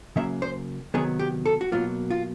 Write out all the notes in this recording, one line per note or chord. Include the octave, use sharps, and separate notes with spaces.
C#3 F#3 A#3 E5
C5
C3 D#3 F#3 B3 G#4
G4
A4
F#4
B2 F#3 A#3 F4
F4